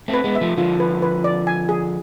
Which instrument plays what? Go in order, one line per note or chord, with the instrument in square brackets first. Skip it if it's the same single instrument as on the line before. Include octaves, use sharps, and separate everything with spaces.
[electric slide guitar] A3 C4
[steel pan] B4
[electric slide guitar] G#3 B3
[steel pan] E5
[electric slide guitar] F3 A3
[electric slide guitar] D3 F3 [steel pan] F4
[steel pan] B4
B4
D5
G#5
G#4